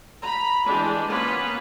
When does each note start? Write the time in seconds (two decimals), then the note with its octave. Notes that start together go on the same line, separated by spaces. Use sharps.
0.22 A#5 B5
0.64 E3 G#3 D4 G4
1.08 A#3 B3 C#4 F4 B4